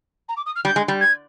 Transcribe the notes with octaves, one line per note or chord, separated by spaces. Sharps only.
A#5
D6
D#6
F6
G3 G6
G#3
G3
G#6